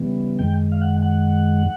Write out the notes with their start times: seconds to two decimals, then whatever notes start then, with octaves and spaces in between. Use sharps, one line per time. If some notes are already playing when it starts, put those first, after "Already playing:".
Already playing: C#3 E3 G3 B3
0.39 F#2 D#3 G#3 G5
0.72 F5
0.82 F#5
1.02 F#5